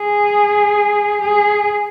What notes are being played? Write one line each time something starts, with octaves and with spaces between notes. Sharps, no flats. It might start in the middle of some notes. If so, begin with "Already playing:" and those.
Already playing: G#4
G#4